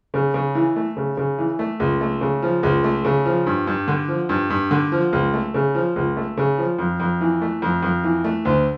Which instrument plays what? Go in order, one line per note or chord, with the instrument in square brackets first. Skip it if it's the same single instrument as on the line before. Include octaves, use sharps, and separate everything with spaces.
[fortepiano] C#3
C#3
E3
A3
C#3
C#3
E3
A3
C#2
A3
C#3
F3
C#2
A3
C#3
F3
G2
G2
D3
F3
G2
G2
D3
F3
C#2
A3
C#3
F3
C#2
A3
C#3
F3
F2
F2
E3
A3
F2
F2
E3
A3
D2